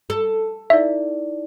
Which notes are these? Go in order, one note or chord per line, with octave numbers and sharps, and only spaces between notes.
A4
D#4 E4 D5 E5